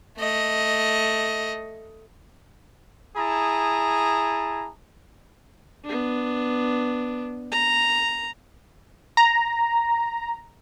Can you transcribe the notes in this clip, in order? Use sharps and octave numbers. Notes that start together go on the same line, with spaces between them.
A3 D#5
E4 G#4 A5 A#5 D#6
B3 D4
A#5
A#5